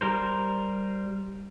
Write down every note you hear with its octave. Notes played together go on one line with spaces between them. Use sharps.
G3 A#4 C5